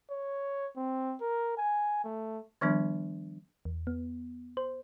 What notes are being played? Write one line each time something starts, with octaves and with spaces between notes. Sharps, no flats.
C#5
C4
A#4
G#5
A3
D#3 F3 G3 B3 D4
E2
B3
C5